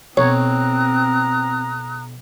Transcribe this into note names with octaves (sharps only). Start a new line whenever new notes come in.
B1 C4 C#5 A#5 D#6 F#6